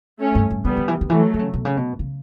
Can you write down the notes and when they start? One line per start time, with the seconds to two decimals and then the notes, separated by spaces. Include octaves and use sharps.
0.20 A3 C#4
0.35 G2
0.51 G2
0.65 D3 G3 B3
0.77 D3
0.88 E3
1.01 D3
1.09 E3 F#3 A3
1.34 D3
1.39 C#3
1.54 B2
1.65 C#3
1.77 B2
1.99 C#3